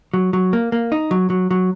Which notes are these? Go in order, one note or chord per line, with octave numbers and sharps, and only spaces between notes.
F#3
F#3
A#3
A#3
D#4
F#3
F#3
F#3